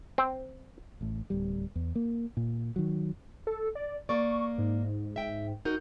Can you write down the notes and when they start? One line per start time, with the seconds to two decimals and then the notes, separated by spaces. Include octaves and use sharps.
0.18 C4
1.01 A1 A2
1.30 D1 G3
1.75 E2
1.95 A#3
2.37 A#2
2.76 D#3 F#3
3.47 A4
3.75 D5
4.09 A#3 D5 C#6
4.58 G#2
5.16 E5 G5
5.65 D#4 F#4 A#4 G6